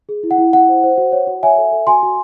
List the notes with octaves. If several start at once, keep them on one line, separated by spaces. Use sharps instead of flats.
G#4
E4
F#5
E4
E4 F#5
C5
C5
F#4
C#5
F#4
C#5 E5 G#5
A4
A4
F#4 G#5 C6
F#4